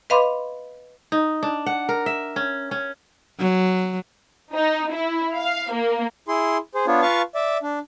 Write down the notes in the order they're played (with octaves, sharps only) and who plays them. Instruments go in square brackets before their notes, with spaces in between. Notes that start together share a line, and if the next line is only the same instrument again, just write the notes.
[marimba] B4 D#5 F5 B5 C6 D6
[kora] D#4
D4
F#5
A#4
E5
C#4
C#4
[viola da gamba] F#3
[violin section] D#4
E4
F5
A#3
[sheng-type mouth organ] E4 G#4 C6
G#4 C5
B3 D4 F4 C#5
F4 B4 F5 A5 C#6
D5 E5
D4